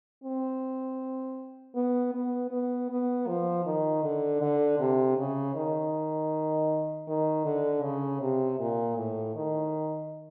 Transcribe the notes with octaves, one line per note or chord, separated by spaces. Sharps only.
C4
B3
B3
B3
B3
F3
D#3
D3
D3
C3
C#3
D#3
D#3
D3
C#3
C3
A#2
A2
D#3